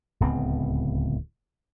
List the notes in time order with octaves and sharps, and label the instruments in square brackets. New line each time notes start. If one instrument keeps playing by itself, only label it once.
[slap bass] D1 C#2 B3 C4